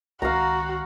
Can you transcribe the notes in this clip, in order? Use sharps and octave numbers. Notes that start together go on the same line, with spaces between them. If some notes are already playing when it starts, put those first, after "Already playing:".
C#2 D#3 F#4 F5 A#5